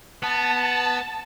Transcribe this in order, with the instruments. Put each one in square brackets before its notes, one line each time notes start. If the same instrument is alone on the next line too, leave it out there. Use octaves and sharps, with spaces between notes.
[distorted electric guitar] B3 [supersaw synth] A5